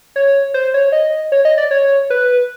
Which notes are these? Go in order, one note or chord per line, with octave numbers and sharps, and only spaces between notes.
C#5
C5
C#5
D#5
C#5
D#5
D5
C#5
B4